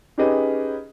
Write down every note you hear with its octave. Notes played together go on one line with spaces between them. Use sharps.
C#4 D#4 G4 G#4 B4 D#5